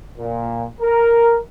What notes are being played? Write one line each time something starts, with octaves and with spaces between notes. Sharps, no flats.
A#2
A#4